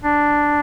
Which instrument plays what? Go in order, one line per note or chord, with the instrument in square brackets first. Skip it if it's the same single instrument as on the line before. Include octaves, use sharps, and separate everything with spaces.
[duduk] D4